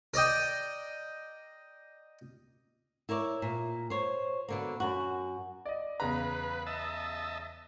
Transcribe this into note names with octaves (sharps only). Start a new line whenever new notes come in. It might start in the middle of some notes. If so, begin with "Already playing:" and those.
A#4 D5 D#5 G5
E4 A#4 C#5 D5
A#2
C5 C#5
B2 D3 A#3
F#2 F#4
D5 D#5
E2 C#3 B4 A#5
D#5 E5 A5